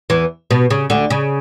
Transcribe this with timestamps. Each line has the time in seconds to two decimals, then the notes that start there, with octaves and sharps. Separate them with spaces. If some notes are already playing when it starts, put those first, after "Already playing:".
0.10 E2 E3
0.51 B2
0.70 C#3
0.90 D2 D3
1.10 C#3